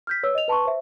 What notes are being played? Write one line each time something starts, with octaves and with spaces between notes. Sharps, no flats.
F6 G6 B6
B4 C#5 E6
D#5 F7
B4 A5 C6 C#6
C5 E5